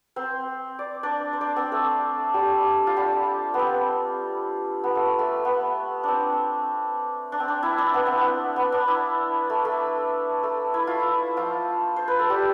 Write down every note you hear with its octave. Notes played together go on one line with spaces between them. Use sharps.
C4 C5
D5
D4 D5
C5
D4 D5
C4 C5
A3 A4
G3 G4
F4
G3 G4
B3
C4
B3
A3
A3
B3
C4 D4
D4
C4
D4
E4
D4
B3
C4
B3
B3
D4
E4
A3
A3
A3
E4
F4
E4
F3 F4
C5
B4
A4
G3 G4